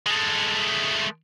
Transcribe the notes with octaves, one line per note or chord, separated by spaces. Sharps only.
G#3 A3